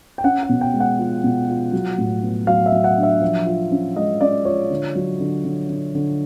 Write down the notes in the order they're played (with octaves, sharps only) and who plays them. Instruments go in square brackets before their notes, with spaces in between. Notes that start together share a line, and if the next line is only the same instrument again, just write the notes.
[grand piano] G5
C#4 F#5
F#5
B2
G5
G#3
F#5
F4
B2
F4
F#3
A2
B3
F#3 F5
E5
F#3
F#5
D4
E5
F3
F4
C#4
G#3 D#5
C#4 D5
F4 C#5
D3
F#3
D3
D3
D3
D3